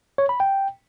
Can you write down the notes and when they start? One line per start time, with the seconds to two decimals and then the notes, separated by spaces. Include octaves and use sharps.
0.18 C#5
0.29 B5
0.40 G5